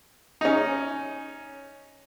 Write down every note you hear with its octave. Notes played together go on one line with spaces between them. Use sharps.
C#4 D#4